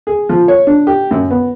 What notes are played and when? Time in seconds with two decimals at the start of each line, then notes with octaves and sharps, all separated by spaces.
0.07 G#4
0.29 F3
0.48 C#5
0.67 D4
0.87 G4
1.11 F#2
1.31 B3